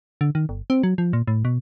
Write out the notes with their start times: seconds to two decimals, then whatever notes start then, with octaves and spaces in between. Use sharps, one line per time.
0.21 D3
0.35 D#3
0.49 G1
0.70 C4
0.83 F#3
0.98 F3
1.13 A#2
1.27 A2
1.45 B2